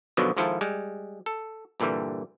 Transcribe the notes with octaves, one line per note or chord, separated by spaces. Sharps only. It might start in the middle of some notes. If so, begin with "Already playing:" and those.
B2 D3 D#3 F3 F#3 B3
G#1 G#2 F3 E4 F4 A4
G3 G#3
A4
G2 A#2 D3 E3 G3